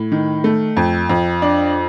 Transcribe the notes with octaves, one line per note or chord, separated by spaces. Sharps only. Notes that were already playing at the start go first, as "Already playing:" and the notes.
Already playing: A2
D#3
A3
F2
F2
D4